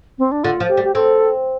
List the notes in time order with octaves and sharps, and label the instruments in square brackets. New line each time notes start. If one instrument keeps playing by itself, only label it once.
[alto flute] C4
D4
[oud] D3 [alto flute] F4
[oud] F3
[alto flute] G4
[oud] G3
[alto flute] G4
[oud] C4 [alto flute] A4